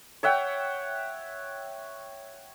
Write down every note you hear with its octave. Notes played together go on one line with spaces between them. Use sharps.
C#5 E5 F#5 G5